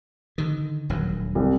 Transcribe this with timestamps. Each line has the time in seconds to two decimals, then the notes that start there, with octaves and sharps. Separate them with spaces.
0.38 D3 D#3
0.89 D#1 D2 F#3
1.35 C2